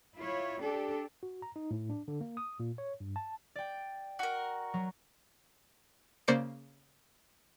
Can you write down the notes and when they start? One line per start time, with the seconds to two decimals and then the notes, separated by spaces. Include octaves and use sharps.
0.17 E4 F4 C#5
0.62 D4 G4 A4
1.23 F#4
1.42 A#5
1.56 D#4
1.71 A2
1.90 D4
2.08 D3
2.21 A#3
2.37 D#6
2.60 A#2
2.78 C#5
3.00 G2
3.16 A5
3.55 D5 G5
4.19 F#4 A#4
4.74 F#3
6.28 C#3 A#3 C5 D5 C#7 D7